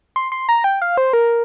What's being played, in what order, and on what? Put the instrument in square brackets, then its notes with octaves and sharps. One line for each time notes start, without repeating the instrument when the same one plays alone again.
[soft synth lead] C6
C6
A#5
G5
F5
C5
A#4